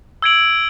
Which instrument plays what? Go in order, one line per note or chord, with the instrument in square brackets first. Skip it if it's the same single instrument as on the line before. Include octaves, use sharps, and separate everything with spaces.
[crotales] E6 G#6 D7 F#7